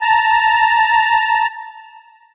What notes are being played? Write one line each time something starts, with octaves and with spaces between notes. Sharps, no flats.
A5 A#5